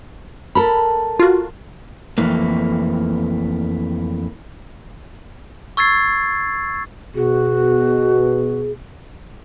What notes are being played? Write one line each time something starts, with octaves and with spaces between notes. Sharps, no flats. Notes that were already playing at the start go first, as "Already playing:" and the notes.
A4 A#4 B5
F4 F#4
F2 E3 A3 A#3
C#6 E6 G#6 A6 C7
B2 F#4 G#4